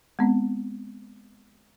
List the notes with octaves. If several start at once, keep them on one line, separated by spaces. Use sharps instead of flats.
G#3 B3 C4